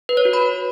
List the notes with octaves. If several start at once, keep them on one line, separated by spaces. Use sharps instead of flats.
B4
C#5
F#4
B5